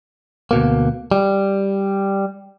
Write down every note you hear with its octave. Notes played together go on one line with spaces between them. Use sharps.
D2 B2 A#3
G3